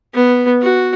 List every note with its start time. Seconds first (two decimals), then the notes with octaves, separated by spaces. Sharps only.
0.15 B3
0.62 F#4